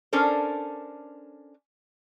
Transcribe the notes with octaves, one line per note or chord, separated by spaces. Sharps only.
C#4 D4 A4 A#4 C5